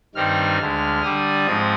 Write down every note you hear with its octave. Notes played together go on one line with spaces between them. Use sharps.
G2 D#3 G3 C4 D#4 F6
D2 D3 G#3
D3 G3 D4 D#6
G#2 F3 C4